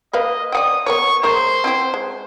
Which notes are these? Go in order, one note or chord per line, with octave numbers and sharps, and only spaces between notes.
A#3 B4 D#5 F5
D5 F#5 G5 D#6
B3 A#4 C#5 C#6
G#3 A#3 A#4 C5
C4 E4 G4
G#3